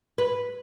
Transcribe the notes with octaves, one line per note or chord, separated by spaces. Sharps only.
B4